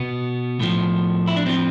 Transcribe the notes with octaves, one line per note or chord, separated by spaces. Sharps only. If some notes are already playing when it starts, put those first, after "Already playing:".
Already playing: B2 B3
A2 F3
E4
D4
A2 F3 C4